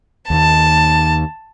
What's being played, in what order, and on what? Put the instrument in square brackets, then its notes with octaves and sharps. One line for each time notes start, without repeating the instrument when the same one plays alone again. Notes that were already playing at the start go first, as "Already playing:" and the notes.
[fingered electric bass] D#2 D#3 [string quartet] A5